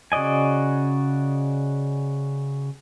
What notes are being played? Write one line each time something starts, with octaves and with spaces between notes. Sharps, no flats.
C#3 F#4 D5 D#5 G#5